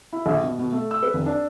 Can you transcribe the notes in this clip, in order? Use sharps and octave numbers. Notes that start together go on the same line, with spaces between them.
E4
A#1
B2
B2
A3
E6
B4
F1
D4